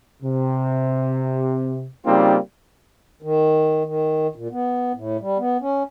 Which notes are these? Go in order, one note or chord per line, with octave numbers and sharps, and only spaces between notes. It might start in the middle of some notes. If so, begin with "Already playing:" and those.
C3
C#3 G3 A#3 C4 D#4 F4
D#3
D#3
A#2
B3
A2
G3
B3
C#4